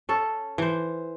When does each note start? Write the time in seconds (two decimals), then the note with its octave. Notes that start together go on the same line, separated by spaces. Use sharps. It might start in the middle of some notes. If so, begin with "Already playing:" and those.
0.09 C#4 A4
0.58 E3 C5